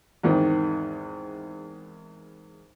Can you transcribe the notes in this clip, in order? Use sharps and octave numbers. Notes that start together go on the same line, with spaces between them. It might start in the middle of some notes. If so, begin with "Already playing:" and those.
E2 G#2 D#3 C4